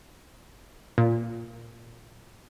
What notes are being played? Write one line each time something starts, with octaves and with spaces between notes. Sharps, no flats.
A#2